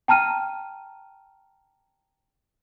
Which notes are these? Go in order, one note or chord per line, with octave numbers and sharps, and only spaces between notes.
G5 A5 A#5 F6 D#7